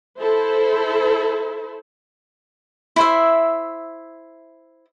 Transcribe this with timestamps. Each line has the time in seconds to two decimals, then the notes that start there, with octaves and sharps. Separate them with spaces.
0.19 E4 A4 C5
2.96 E4 C5 E5